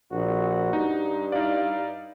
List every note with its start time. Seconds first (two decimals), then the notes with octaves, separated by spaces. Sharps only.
0.11 A#1 F#4
0.73 G2 D#4
1.32 D#4 E4 D5 F5